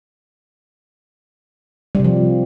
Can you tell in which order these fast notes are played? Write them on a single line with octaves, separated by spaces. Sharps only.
G3 C3 F3